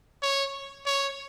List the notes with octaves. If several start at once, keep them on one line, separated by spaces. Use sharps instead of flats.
C#5
C#5